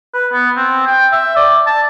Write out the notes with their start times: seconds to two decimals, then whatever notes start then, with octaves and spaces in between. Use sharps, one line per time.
0.14 B4
0.33 B3
0.57 C4
0.87 G5
1.12 E5
1.36 D5
1.67 A5